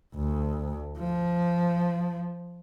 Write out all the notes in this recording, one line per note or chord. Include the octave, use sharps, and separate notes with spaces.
D2
F3